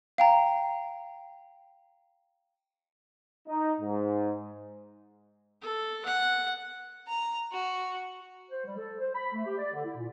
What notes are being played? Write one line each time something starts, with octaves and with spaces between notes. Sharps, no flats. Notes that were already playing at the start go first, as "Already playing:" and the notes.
F5 G5 A#5
D#4
G#2
A4
F#5
A#5
F#4
C5
G3
A4
C5
B5
A3
G4
D5
D3
E4
A#2